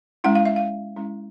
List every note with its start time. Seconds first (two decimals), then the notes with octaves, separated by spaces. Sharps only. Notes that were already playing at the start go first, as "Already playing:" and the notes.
0.24 G#3 C#4 E4 F#5
0.35 F5
0.45 E5
0.56 F5
0.96 G#3 C#4 E4